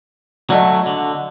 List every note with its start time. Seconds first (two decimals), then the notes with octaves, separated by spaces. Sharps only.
0.50 F#3 A3 D5 D#5
0.86 D3